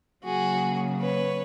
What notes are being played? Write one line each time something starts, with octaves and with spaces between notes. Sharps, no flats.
C#3 F#3 A#3 F#4 G#4
B4 C#5